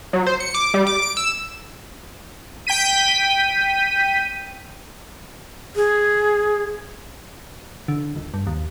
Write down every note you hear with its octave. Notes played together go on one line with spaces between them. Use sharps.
F#3
C5
C#7
D6
G3
D6
D7
E6
G5 G6 B6 D#7
G#4
D3
D#1
G2
D#2